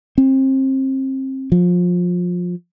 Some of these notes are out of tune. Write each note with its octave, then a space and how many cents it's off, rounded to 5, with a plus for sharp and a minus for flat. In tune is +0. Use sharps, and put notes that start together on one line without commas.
C4 +30
F3 +25